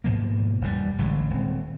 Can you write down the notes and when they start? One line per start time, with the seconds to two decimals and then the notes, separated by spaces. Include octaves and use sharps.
0.04 G#2 B2 F3 A#3
0.61 E1 D#2 A#2 G3
0.98 A1 D3 F#3 G#3
1.30 D#1 C4